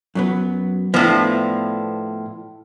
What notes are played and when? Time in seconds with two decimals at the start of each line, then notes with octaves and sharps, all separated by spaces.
0.15 F#2 F#3 B3
0.94 A2 F3 B3 D4